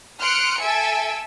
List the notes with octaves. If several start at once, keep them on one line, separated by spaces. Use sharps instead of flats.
C6 D#6 F6 F#6 C#7 D7
A4 E5 G#5 E6 D7